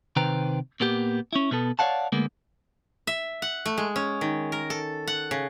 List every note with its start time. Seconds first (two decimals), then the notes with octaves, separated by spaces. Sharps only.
0.16 C3 D#3 B4 C5 G5 A#5
0.80 A#2 A#3 B3 G4
1.33 C#4 E4
1.51 B2 B3 A4
1.79 C#5 D5 F5 F#5 A5
2.12 D2 G#3 A#3 B3
3.07 E5
3.42 F#5
3.66 A3
3.78 G#3
3.96 C#4
4.21 D#3
4.52 A#4
4.70 A4
5.07 F#5
5.31 C#3